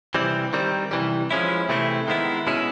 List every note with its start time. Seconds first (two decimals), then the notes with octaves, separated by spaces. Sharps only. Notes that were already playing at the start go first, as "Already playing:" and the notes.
0.14 C3 E3 G3 C4
0.53 D#3 G3 C4
0.91 C3 E3 G3
1.31 F3 G#3 C#4 E4
1.69 C3 E3 A3 C4 E4
2.07 D#3 G#3 B3 E4
2.47 B2 G#3 C#4 E4